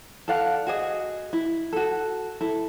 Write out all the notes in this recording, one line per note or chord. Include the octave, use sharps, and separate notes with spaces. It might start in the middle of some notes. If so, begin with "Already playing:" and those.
A4 D5 F5 F#5
F#4 G#4 D#5
E4
F#4 A4
E4 A4